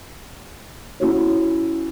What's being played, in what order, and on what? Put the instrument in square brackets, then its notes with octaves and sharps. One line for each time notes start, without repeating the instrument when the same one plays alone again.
[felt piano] C#4 E4 F#4 C#5